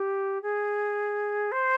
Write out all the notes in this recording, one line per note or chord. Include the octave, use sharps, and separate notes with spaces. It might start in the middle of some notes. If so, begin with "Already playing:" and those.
Already playing: G4
G#4
C5